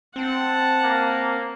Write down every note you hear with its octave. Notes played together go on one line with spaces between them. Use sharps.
C4 F#5 A5
A#3